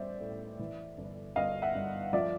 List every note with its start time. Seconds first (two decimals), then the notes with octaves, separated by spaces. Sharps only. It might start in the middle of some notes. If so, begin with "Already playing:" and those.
Already playing: A1 G3 C5 D5 E5
0.21 A2
0.59 E3
0.98 G1
1.36 G1 D#5 F5
1.62 E5 F#5
1.75 G2
2.13 F3 D5 E5